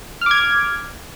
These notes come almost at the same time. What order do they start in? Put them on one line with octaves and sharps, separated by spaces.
F6 D6 G#6